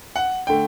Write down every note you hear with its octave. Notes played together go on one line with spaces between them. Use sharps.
F#5
D3 A3 G5